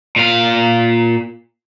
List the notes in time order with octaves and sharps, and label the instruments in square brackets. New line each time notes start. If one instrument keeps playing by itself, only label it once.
[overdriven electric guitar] A#2 F5